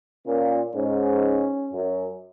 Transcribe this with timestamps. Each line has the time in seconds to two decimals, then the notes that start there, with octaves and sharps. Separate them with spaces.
0.26 A#2 C#4
0.75 G#2 C#4
1.73 F#2